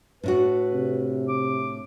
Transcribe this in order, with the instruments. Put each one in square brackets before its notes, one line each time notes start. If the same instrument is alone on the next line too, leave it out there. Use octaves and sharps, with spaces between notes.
[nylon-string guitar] A2 D4 F#4 [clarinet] B4
[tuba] C3
[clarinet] D6